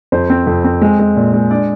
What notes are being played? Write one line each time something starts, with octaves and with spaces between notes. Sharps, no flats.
F2 C5
C4
F2
C4
G#3
G#3
A#2
G#3
D4 D5